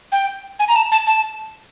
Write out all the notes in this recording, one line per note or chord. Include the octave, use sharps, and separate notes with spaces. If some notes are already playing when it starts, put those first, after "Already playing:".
G5
G#5
A#5
A5
A5
A5